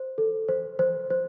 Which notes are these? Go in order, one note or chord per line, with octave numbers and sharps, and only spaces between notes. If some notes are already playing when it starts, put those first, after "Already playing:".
Already playing: C5
A4
C5
C5
C5